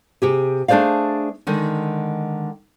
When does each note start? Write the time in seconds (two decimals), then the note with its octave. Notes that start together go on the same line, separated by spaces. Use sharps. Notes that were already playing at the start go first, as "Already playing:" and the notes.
0.22 C3 G4 G#4
0.68 A3 D4 G#4 C5 D5 F5
1.47 D3 D#3 G#3